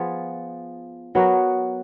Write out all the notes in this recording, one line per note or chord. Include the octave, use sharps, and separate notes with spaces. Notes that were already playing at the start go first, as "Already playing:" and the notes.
Already playing: F3 B3 F4 G#4
F#3 B3 F#4 A#4